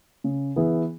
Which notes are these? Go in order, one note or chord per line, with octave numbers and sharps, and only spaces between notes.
C#3
E3 B3 E4 G#4